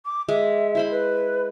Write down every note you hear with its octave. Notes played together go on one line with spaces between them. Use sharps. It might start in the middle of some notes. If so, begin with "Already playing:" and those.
D6
G#3 E5
E4 C5 B5
B4